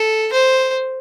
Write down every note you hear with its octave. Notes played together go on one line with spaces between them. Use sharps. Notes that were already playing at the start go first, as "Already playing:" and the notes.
Already playing: A4
C5